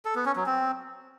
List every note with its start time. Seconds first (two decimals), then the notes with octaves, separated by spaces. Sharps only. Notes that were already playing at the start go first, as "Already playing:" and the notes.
0.05 A4
0.15 B3
0.26 C#4
0.36 F#3
0.46 C4